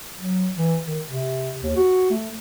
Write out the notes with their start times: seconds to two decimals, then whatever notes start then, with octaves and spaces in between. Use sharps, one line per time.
0.18 F#3
0.57 E3
0.86 D#3
1.06 C3
1.63 D#2
1.76 F#4
2.10 A3